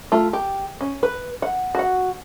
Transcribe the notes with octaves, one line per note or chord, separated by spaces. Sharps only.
A3 F4
G4
C#4
B4
F#5
F#4 F#5